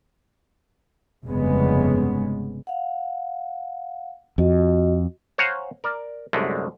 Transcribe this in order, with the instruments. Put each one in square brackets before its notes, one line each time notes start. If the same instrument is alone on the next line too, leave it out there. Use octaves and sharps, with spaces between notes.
[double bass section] F1 G2 C#3 G#3 B3
[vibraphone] F5 F#5
[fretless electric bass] F2 [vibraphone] F#4 D#5
[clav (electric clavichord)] C5 C#5 F5 F#5 G#5 A#5
A#4 D5
C2 F#2 D3 G#3 A3